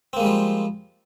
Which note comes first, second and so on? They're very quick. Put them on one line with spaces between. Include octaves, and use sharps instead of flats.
C4 A#3 G#3 G3 F3